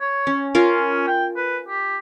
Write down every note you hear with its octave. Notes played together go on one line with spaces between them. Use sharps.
C#5
C#4
C#4 F4 A#4
G5
B4
G4